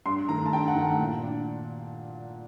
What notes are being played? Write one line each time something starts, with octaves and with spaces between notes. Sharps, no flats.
G2 C6
D#3 A3 A#5
A5
G2 G5
F#5
D#3 A3
A#2
D4